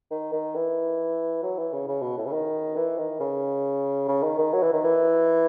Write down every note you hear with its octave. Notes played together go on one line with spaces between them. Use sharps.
D#3
D#3
E3
F#3
E3
C#3
C#3
B2
A2
C#3
D#3
E3
D#3
C#3
C#3
D#3
D#3
F#3
E3
D#3
E3